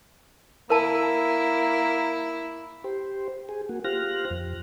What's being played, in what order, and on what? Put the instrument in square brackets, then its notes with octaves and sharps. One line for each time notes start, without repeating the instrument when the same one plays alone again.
[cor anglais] A#3 [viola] E4 [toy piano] A#4 A5
[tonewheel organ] G4 C5
G#4
A#3 F#4
F4 G4 C5 F6 F#6 A#6
F2